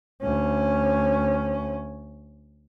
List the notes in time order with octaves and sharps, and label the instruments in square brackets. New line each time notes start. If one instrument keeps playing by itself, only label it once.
[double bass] D2 C#4